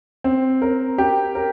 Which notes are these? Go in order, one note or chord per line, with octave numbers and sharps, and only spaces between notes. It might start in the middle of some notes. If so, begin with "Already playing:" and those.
C4
A#4
G4
A#4